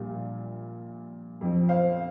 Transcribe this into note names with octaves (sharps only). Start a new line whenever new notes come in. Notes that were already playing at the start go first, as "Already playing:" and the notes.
Already playing: A#1 A#2 G3 F5
F2 F3
C5 F5